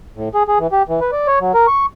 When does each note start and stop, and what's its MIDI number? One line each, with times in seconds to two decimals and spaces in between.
0.16 0.29 45
0.34 0.43 68
0.48 0.59 68
0.59 0.67 52
0.72 0.83 67
0.89 1.00 52
1.01 1.11 71
1.12 1.27 74
1.27 1.39 73
1.40 1.52 54
1.54 1.67 70
1.67 1.86 85